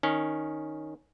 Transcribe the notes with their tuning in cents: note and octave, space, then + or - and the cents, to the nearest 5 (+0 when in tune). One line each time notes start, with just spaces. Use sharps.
D#3 +0 C#4 +0